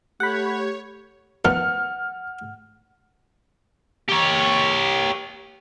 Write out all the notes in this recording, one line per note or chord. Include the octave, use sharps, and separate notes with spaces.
A3 G4 C#5 F#5 B5
D#3 F3 B3 F#5 F6
G4 C#5